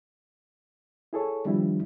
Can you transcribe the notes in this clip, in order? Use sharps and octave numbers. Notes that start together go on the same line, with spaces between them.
E4 G#4 A4 C#5
D#3 F3 G3 B3 D4 E4